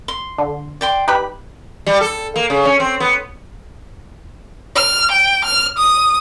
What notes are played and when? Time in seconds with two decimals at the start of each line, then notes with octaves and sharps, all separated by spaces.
0.08 C6
0.38 D3
0.81 D5 G5 C6
1.08 D#4 G4 B4 B5
1.86 G3
2.01 A4
2.36 A#3
2.50 C#3
2.65 C#4
2.80 C4
3.00 B3
4.76 F6
5.12 G5
5.45 F6
5.78 D#6